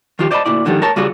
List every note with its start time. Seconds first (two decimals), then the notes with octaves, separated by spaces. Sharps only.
0.19 D#3 F3 F4 G4
0.31 C5 D5 D#5 F5 A5 B5
0.46 D2 A#2 E4 D5
0.65 G#2 D3 D#3 F3 G3
0.82 A#4 C#5 A5
0.96 C#3 G3 F4 F#4 G#4